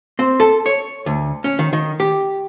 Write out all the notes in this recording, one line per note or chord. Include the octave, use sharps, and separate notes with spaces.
C4
A4
C#5
D2
C#4
D#3
D#3
G4